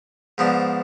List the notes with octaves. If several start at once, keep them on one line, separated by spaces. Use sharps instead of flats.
G#2 F3 B3 D4